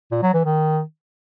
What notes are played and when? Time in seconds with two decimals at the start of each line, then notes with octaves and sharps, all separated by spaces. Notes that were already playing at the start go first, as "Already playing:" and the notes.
0.11 A#2
0.23 F#3
0.34 E3
0.45 D#3